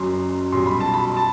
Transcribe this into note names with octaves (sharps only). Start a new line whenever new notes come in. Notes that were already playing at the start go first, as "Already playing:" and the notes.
Already playing: F#1 F#2 F#3 C6
B1 B2 G3 C6
B5
A5
B5
A5